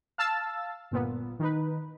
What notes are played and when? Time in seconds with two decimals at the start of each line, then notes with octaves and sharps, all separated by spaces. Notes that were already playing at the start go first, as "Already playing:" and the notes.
0.18 F5 A5 E6 A6
0.91 G1 A#2 B3
1.39 D#3 D#4 B4